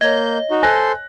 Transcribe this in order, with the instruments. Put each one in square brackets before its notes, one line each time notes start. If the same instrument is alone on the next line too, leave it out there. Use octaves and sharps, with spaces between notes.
[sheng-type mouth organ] A#3 G6 [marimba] C#5 G#6 [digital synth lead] D#5
[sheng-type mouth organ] D#4 F#4
[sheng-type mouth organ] A4 C5 C6 [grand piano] G#5 F#6 A#6